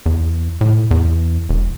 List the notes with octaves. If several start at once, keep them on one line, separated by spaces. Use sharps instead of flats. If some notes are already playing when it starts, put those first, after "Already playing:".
E2
A2
E2
E1